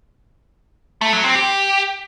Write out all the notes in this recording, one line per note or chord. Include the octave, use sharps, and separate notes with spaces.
A3
F#3
C4
G4